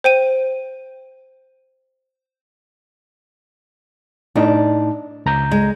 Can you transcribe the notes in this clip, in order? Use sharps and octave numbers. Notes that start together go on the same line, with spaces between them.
C5 G5 D#7
A2 D4 D#4 A5
C#2 A#5 G6
G#3